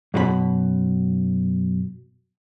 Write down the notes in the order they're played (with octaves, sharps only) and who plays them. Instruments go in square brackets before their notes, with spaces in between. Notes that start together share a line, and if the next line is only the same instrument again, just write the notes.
[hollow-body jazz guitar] F#2 B2 F#4 B5